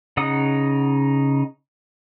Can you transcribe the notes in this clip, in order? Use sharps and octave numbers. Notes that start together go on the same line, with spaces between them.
C#3 D#4 F#5 D#6